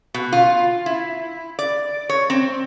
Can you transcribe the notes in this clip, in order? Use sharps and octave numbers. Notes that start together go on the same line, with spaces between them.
B2
F4
E4
D5
C#5
C4